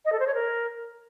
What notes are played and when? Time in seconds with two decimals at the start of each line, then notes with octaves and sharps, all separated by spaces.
0.05 D#5
0.12 A4
0.20 C5
0.27 C#5
0.34 A#4